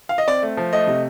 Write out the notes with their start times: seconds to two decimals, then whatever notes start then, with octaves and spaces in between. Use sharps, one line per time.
0.09 F5
0.18 D#5
0.28 C4 D5
0.42 A3
0.57 F3
0.73 A3 D#5
0.87 C3